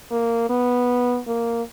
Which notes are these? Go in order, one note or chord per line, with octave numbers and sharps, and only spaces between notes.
A#3
B3
A#3